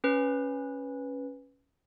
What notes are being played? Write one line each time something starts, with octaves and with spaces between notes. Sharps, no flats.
C#4 B4